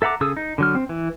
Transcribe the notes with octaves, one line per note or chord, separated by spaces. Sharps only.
A4 E5 F#5 A#5 D6
C#3 G#4 A4 D#6 E6
D#4
D3 F#3 F6
C4
E3